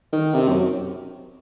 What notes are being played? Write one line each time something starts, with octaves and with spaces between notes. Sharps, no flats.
D#3
C3
F#2